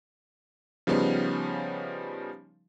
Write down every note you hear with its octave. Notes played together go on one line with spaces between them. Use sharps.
C#3 F3 G3 B3 C#4 D#4